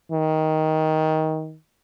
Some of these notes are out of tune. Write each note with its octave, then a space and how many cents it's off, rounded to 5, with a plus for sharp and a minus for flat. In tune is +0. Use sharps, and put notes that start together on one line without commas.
D#3 +15